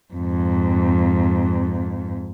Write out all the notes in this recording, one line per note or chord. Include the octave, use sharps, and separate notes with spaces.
F2 G#2